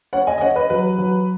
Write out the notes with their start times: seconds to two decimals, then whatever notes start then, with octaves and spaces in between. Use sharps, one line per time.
0.13 C#4 C#5 F#5
0.27 D#5 G#5
0.38 D#5
0.41 C#4 C#5 F#5
0.56 B4 D#5
0.70 F#3 B4
0.98 F#3